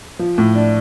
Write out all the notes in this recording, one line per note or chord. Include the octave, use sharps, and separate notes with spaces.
F3
A2
D4